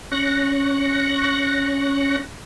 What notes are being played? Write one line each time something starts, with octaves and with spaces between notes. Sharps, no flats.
C#4 C#6 F#6 A#6